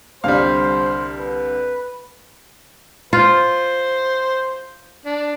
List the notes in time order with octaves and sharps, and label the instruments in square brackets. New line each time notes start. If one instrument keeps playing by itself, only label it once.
[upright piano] C2 D3 [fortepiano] G3 F5 [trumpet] C5
[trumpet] B4
[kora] F4 [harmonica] C5
[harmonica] D4